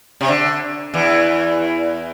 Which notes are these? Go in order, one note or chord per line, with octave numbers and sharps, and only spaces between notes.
C3
D3
E2 E3